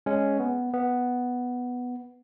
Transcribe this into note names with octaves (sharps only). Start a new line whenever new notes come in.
G#3 C#4
B3
B3